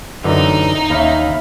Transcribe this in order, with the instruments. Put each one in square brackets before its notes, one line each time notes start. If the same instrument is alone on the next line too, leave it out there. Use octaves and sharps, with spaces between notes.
[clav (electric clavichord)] F#2 D3 E3 [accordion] A2 [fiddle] D#4
[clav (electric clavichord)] D#2 [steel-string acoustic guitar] C#4 E5 [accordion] F5 B5